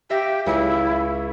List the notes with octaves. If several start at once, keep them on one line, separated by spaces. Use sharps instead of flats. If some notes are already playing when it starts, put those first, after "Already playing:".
G4 E5 F5 A#6
C#2 E4